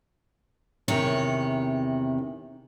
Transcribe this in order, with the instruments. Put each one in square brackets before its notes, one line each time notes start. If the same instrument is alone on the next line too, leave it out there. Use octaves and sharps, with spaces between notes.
[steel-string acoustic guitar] E2 C3 D#3 C#5